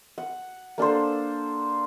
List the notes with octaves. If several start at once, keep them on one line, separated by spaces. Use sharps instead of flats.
F#5
A#3 D4 A4 C5